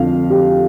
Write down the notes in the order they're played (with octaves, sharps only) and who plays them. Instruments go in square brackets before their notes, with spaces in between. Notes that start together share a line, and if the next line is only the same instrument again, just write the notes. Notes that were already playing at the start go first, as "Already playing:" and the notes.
Already playing: [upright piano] F2 D3 F3 F5
G4